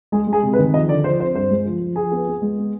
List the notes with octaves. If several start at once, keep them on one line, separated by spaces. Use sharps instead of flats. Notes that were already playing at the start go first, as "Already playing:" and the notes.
G#3 G#4
G#3
G#4
C3
B4
D#3
F3 D#5
D3 D5
F3 C5
C4 C5
G2 C5
G#3
F3
F3
F3 G#4
B3
B3
G#3
B3